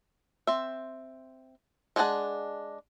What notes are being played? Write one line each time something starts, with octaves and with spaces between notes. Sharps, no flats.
C4 E5
G#3 D4 G#4 F#5 A5